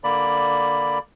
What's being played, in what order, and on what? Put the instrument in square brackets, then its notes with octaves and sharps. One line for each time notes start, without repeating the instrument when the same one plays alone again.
[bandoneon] D3 A#3 D5 B5